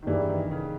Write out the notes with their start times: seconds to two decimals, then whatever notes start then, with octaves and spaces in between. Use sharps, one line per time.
0.03 D#3
0.06 G2 E3 G3 A#3 E4 G#4
0.29 D#3
0.51 C#3